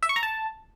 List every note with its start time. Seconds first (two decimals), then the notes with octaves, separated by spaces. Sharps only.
0.03 E5
0.09 C#6
0.16 A#5
0.23 A5